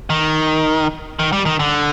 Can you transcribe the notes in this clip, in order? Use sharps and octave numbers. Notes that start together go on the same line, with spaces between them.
D#3
D#3
G3
D#3
D3